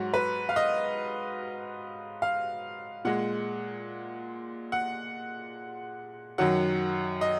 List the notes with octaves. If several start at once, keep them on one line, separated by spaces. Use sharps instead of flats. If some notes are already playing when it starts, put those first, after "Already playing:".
Already playing: G#2 F#3 F#4
B4
F5
D#5
F5
A#2 G#3 F#5
F#5
F#2 D#3 F#3 F#5
D#5